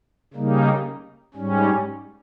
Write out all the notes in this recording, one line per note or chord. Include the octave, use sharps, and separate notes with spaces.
C#3 G3 A#3 D#4
G#2 G3 C#4